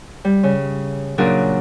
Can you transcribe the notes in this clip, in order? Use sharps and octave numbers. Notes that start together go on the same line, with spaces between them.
G3
C#3
A#2 C#3 F#3 D4 G#4 A#4